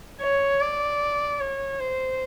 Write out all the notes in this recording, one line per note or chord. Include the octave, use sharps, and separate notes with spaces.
C#5
D5
C#5
C5